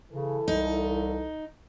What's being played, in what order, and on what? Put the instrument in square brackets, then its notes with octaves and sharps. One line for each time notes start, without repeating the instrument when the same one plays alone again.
[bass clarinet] C#3 [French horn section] E3 A4
[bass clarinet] C2 [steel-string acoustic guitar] D#4